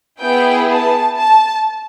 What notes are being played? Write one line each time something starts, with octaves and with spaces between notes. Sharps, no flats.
B3 E4 G#4 G5
A5
A5